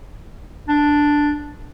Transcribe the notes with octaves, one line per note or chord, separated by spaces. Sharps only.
D4